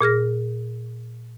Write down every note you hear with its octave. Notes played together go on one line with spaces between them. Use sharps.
A#2 G#4 F6 A#6